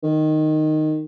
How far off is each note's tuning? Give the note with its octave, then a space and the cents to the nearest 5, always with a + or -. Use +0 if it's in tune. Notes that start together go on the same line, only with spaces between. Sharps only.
D#3 -10